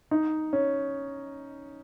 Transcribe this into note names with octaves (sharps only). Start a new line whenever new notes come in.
D#4
C#4